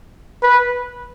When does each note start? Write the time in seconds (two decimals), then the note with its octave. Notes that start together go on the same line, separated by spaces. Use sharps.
0.43 B4